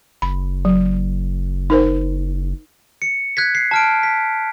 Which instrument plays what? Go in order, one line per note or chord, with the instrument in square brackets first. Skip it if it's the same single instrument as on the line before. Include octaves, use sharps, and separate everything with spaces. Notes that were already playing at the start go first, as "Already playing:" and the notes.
[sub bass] F#1 [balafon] B5
[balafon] F#3
D#4 A#4 C5
[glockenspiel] C#7
F#6 G#6 B6
C7
A5 F6 D7
B6